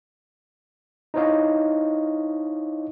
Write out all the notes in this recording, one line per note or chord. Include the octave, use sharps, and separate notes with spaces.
D#4 E4 C5 C#5 D#5 F5